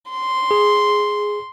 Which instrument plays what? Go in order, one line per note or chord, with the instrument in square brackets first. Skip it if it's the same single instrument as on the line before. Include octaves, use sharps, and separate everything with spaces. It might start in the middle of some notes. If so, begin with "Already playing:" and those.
[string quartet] C6
[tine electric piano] G#4